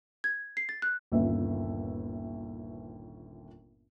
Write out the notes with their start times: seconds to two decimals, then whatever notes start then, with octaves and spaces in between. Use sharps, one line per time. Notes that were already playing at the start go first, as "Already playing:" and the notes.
0.24 G#6
0.57 C7
0.69 A6
0.82 F#6
1.12 G1 D#2 A#2 C#4 B4 E5